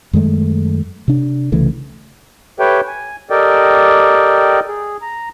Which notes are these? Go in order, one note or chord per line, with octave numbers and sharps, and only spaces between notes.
F#2 D#3 G#3 A3
C3 D4
C2 C#3 E3 A3
G4 A4 B4 C#5 E5 G5
G#5
G4 A4 A#4 D5 D#5 G5
G#4
A#5